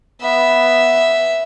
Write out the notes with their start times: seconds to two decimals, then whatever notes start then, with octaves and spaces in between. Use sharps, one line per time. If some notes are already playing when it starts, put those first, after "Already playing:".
0.22 B3 E5